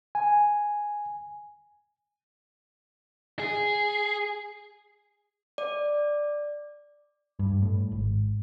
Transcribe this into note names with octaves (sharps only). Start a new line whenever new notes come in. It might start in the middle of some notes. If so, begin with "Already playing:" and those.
G#5
G#4
D5
G2
A2
G#1